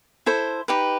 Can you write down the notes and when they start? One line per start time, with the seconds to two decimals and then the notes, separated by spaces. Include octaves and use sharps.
0.26 E4 A4 C5
0.68 D#4 G4 B4